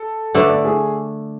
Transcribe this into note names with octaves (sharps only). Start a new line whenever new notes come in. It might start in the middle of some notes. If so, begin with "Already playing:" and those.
Already playing: A4
D3 A3 D4 B4
D5
G#4